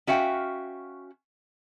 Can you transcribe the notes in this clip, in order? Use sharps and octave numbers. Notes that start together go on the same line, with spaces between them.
C#4 F#4 E5 F5 G5